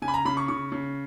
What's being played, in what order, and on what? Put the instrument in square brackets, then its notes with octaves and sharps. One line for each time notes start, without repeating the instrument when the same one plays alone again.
[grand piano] C#3 G#5
B5
A#5
C#3 B5
C#6
C#3 C#6
C#3